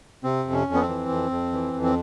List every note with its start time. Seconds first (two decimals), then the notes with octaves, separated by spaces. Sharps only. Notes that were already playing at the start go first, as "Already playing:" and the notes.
0.24 C3 C4
0.45 F2
0.53 C#4
0.67 F2
0.74 B3
0.81 C4
0.88 E3
1.09 F2
1.30 F2
1.53 E3
1.73 F2
1.83 C4